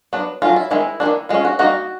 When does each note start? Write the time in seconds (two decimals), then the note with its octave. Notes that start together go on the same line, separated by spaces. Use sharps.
0.13 F#3 B3 D4
0.42 F#3 A3 C#4 F4
0.56 E4
0.71 D#3 G#3 C4 E4
1.00 G3 A#3 D4
1.05 D#3
1.29 G#3 C#4 F4
1.45 F#4
1.59 G3 A#3 D#4 F#4